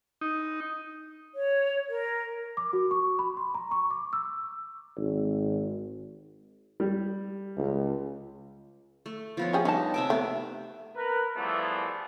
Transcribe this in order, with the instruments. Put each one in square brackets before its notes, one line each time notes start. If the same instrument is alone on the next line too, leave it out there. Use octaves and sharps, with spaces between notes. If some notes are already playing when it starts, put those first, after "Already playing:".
[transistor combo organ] D#4
[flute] C#5
A#4
[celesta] D6
F#4
C#6
B5
C6
A#5
C#6
D6
E6
[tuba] G#1
[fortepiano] G3
[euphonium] C#2
[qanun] A3
F3 B3 C#5
[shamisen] C#4 G4 G#4
[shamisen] G3 D4 A5 [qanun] D#4
[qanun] C3 E5 D6
[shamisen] A3 [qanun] B3
[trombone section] A#4 B4
E2 E3 F3 G3 A3 B3